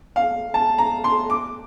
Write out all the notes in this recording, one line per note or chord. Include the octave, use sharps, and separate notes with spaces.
F5
A5
A#5
C6
D6